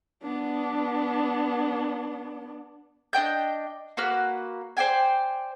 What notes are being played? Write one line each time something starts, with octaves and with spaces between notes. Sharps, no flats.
B3 D4
D4 D#5 G5 G6
A#3 F#4 B4 F6
C5 D5 G5 G#5